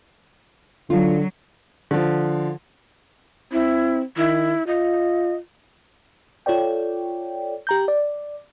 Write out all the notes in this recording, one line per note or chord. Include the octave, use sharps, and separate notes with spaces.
D3 F#3 F4
D3 F3
C4 E4
D#3 E4
F4 D#5
F4 A4 C#5 D5 G5
G4 A#5 G6
D5